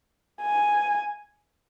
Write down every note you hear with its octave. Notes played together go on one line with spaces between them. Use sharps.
G#5